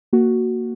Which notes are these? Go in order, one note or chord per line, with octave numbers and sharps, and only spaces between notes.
A#3 F#4